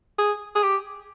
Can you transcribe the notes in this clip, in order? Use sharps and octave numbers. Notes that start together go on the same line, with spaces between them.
G#4
G#4
G4